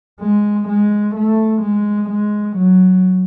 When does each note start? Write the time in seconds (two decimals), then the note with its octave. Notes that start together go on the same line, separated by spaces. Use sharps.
0.21 G#3
0.68 G#3
1.15 A3
1.62 G#3
2.10 G#3
2.57 F#3